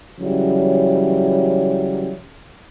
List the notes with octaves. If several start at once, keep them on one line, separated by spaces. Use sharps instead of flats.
C#3 E3 F#3 G3